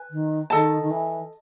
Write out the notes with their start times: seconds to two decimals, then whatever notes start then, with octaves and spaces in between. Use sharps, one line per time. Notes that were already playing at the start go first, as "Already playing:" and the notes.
Already playing: B4 G#5
0.11 D#3
0.50 D#3 A4 D#5 A5
0.82 D#3
0.91 E3